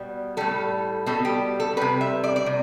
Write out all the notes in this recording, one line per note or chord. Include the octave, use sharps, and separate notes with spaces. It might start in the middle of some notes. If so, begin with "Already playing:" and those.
Already playing: B2 G3
A2 G3 A4
B2 G3 A4
G4
A4
C3 G3 B4
E5
D5
D5
C3